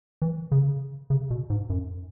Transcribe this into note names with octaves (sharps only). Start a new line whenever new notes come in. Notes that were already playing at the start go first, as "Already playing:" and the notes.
E3
C#3
C#3
B2
G#2
F#2